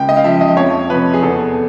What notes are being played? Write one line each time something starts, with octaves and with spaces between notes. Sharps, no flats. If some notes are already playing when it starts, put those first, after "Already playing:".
Already playing: C#2 G5
D#5
F5
C#3 F3 E5
D#5
F2 C#5
C3 F3 B4
G#4
E2 A4